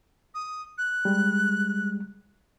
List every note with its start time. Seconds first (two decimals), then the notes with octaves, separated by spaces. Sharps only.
0.35 D#6
0.78 F#6
1.05 G3 G#3